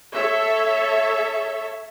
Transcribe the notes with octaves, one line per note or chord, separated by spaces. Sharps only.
A4 C#5 E5